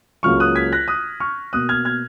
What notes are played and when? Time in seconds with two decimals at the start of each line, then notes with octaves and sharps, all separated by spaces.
0.23 C#2 C#3 F#3 A#3 C#6 F6
0.40 D#6 F#6
0.55 G#6 B6
0.73 F#6 A#6
0.88 D#6 F#6
1.20 C#6 F6
1.53 B2 A#3 D#6 F#6
1.69 F6 G#6
1.85 F6 G#6